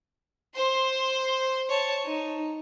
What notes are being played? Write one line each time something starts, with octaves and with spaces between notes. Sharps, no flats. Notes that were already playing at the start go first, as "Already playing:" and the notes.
C5 C6
C#5 A5
D#4